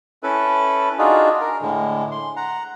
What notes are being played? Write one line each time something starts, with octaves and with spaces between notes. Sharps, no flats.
C#4 E4 A4 B4
D4 D#4 F4 F#4 G#4
A#4
A2 D3 G#3
C6
F#5 A#5